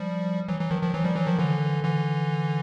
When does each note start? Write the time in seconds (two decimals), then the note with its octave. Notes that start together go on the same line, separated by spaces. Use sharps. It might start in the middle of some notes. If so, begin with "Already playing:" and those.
Already playing: F3 G3
0.48 E3 F#3
0.60 E3 F#3
0.71 D#3 F3
0.82 D#3 F3
0.94 E3 F#3
1.05 F3 G3
1.16 E3 F#3
1.27 D#3 F3
1.39 D3 E3
1.84 D3 E3